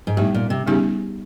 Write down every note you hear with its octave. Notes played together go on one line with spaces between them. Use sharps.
G#2
A2 G3 B3 D#4 G4
A#2
C3
C#3 G3 B3 D#4 G4